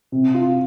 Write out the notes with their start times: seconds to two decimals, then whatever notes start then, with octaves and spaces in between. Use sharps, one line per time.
0.12 C3
0.34 F4